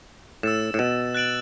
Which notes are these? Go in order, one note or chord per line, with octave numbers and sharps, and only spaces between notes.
A2 E6 A6 E7
A2
B2
F#6 A6 D7 F#7